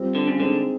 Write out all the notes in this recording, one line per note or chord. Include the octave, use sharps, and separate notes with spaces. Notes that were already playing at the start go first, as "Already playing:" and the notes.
Already playing: G3 C4 F4
D3
C#3
D3 G#3 C4 D#4